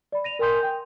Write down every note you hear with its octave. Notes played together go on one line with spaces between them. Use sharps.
D5 B5
A#6 D#7 F7
A#4 G5 G#5 C6 D#6 G6
G5